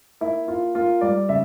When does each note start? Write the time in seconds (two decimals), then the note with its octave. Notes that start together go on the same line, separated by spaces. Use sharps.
0.21 A#3 E4
0.47 A#3 F4
0.75 A#3 F4
1.01 G3 D5
1.29 C#3 E5